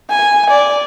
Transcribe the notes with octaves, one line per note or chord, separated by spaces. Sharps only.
G#5
D5